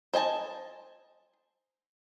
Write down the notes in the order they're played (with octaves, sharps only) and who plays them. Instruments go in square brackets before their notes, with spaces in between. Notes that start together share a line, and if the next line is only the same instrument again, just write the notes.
[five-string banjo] C5 D#5 G#5 A5